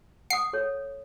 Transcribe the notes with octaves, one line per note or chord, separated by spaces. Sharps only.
F#5 D#6 C7
A4 C#5